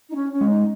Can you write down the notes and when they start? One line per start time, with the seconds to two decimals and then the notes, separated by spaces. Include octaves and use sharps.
0.10 D#4
0.15 C#4
0.32 C#4
0.41 G#3
0.50 D#4